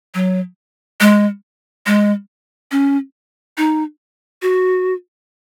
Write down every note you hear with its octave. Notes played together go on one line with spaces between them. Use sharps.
F#3
G#3
G#3
C#4
D#4
F#4